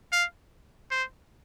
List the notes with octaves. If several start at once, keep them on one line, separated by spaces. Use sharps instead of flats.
F5
C5